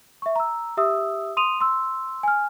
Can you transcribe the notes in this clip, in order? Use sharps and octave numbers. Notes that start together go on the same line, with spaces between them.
E5 C#6
A#5 E6
G4 E5 D#6 E6
C6 D#6 D#7 F7
C6 E6
G#5 F6